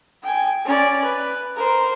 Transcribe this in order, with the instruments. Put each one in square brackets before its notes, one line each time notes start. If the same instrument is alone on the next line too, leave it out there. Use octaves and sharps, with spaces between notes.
[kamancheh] G5 G#5
C#4 D5
B4
A#4 C5